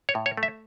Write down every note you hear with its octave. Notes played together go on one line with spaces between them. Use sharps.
C#5
A2
C#5
A3
E5